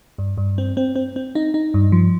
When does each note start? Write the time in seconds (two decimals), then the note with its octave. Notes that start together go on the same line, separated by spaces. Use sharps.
0.18 G2
0.37 G2
0.58 C4
0.77 C4
0.96 C4
1.16 C4
1.35 D#4
1.54 D#4
1.74 G2
1.92 F3